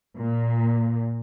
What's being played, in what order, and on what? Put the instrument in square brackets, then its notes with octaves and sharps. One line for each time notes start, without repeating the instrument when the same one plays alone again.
[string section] A#2